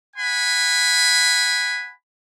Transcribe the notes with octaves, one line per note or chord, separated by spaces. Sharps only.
F#5 G#5 B5